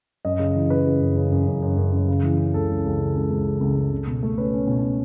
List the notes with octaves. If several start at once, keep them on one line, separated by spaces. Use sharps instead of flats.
F#2 D#5
C#3
E3
C#3 B4
C#3
F#2
C#3
F#2
F#2
F#2
F#2
F#2
C#3
E3
C#3
C#2 A4
C#2
C#2
C#3
C#2
C#2
C#3
C#2
C#2
C#2
B2
A3
C#4 B4
C#4
B2
B2